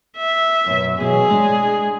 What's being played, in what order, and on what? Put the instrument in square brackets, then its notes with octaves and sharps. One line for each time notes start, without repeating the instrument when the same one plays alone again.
[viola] E5
[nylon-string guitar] F#2 B2
[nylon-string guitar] B2 E3 F#3 [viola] G#4
[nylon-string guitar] G#3 D4